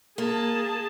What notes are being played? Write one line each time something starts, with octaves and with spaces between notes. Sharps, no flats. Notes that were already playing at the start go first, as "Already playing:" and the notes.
A#3 G#4 A5